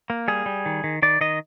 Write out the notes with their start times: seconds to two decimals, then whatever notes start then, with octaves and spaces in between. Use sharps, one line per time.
0.10 A#3
0.28 G3 G#4
0.46 G3
0.66 D#3
0.84 D#3
1.02 D#3 D5
1.21 D#3 D#5